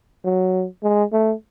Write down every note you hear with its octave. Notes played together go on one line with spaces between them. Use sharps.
F#3
G#3
A3